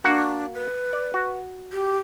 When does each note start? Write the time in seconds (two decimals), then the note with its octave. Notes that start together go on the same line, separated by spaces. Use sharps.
0.04 A#3 D4 F#4 F#5
0.54 B4
0.93 D5
1.14 F#4
1.72 G4